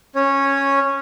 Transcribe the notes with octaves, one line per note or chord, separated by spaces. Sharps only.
C#4 C#5